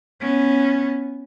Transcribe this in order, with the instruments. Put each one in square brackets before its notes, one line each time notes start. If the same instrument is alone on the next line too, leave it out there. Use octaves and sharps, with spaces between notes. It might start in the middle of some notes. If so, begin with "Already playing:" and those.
[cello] B3 C#4